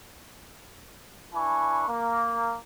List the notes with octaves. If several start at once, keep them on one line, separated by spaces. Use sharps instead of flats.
D4 E4 B4 G#5 C#6
A#3